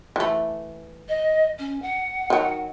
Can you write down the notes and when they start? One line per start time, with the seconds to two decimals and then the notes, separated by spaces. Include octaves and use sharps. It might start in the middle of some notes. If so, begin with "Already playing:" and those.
0.16 E3 A3
1.09 D#5
1.59 C#4
1.82 F#5
2.30 D#3 F#3